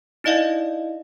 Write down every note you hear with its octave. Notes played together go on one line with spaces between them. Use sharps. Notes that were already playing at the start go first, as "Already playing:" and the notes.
D#4 E4 D5 D#5 F5